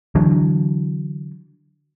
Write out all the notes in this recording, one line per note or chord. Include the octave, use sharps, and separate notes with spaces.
D3 E3 F#3 D4